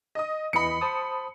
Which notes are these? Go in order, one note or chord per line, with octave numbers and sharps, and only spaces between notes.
D#5 D#6
E2 E3 D#5 B5 C#7
C5 A5 D#6